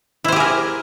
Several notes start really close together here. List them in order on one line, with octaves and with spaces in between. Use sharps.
E4 C5 G4 G#4 A#4